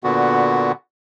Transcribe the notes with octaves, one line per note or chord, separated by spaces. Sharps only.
A#2 D3 B3 F#4